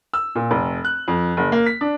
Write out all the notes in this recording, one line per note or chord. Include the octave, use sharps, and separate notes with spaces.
E6
A#2
F1
F#6
F2
F#1
A#3
B6
D4